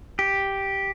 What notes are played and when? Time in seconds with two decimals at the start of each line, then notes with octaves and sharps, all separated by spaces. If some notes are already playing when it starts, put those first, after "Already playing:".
0.19 G4